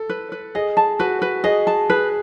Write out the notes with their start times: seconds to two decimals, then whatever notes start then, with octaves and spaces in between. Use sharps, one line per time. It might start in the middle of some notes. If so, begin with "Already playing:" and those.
Already playing: A4
0.09 B4
0.32 B4
0.55 G#4 D#5
0.77 A5
0.99 F#4 B4
1.22 B4
1.44 G#4 D#5
1.67 A5
1.89 G#4 B4